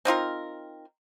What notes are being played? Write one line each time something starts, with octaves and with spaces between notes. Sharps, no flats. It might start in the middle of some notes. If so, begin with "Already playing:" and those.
C4 D#4 F4 A#4